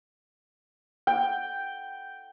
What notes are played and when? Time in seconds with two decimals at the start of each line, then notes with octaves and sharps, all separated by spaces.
1.07 G5